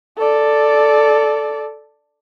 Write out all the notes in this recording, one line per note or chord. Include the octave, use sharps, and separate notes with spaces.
A4 D5